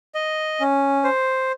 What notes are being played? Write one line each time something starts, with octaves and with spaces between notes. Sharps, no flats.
D#5
C#4
C5